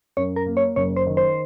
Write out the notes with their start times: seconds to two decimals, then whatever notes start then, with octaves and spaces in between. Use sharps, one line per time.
0.17 F#2 C#5
0.36 A#4
0.46 A#3
0.57 C#5
0.76 F#1 C#5
0.97 C5
1.06 D#3
1.17 C5